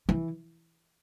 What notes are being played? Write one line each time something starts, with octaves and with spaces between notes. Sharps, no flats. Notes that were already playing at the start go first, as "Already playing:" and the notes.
E3